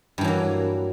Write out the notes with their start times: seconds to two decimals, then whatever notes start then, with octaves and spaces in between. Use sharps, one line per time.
0.18 G2
0.21 E3
0.24 F#3
0.28 A#3